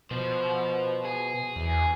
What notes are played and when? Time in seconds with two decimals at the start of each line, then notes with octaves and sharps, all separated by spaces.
0.11 B2 F3 C5
1.05 G#4
1.56 E2